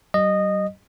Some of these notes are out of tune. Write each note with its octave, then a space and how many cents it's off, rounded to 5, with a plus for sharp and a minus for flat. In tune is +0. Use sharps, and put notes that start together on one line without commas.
G3 -45 D#5 -15